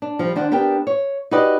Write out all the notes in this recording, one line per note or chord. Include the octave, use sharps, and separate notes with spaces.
D4
F3 G3
D#3 D4 C5 D5 F#5
B3 D4 G4 A#4 G5
C#5
D#4 F#4 G4 B4 D5 D#5